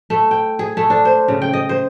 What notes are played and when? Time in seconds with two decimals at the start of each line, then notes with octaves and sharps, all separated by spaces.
0.10 A3
0.31 G5
0.59 G#4
0.77 A3
0.90 D4
1.05 C5
1.28 C#3
1.42 G5
1.53 D#5
1.69 C5